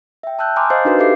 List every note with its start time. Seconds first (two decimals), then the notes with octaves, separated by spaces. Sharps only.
0.23 E5 G5
0.39 A5 E6 F#6 G6
0.56 G#5 A#5 C6 D6 D#6 F6
0.70 C5 D#5 F5 G6 A6 C7
0.85 D4 D#4 F#4 A#4 B4
0.99 G4 A4 E5 F5 D6 C7